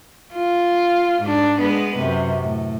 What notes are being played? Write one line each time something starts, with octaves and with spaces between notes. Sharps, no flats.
F4
G#2 D4
G#3 B3 B4
F#2 C3
A2